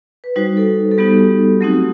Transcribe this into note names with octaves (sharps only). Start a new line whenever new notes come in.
B4
G3 D#4 F#4 C5
A4
A4
G3 B3 D#4 F#4 G4
F#3 A3 C4 D#4 F#4